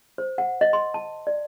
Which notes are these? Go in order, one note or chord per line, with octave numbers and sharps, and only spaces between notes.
C5
F#5
D#5
C6
A5
D5